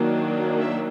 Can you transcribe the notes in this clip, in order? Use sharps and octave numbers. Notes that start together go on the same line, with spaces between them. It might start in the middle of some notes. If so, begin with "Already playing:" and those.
Already playing: D#3 F#3 A#3 D4
E5